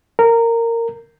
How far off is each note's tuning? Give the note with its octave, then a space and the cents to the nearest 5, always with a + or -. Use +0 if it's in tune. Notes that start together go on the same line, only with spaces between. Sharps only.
A#4 -15